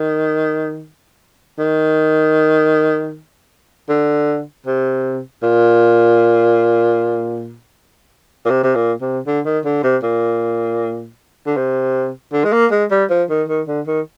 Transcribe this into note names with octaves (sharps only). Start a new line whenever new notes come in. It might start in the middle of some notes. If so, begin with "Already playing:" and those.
Already playing: D#3
D#3
D3
C3
A#2
A#2
C3
C3
A#2
C3
D3
D#3
D3
C3
A#2
D3
C3
D3
G#3
A#3
G#3
G3
F3
D#3
D#3
D3
D#3